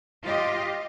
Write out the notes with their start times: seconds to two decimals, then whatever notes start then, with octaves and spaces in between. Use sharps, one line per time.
0.23 F4 G4 D#5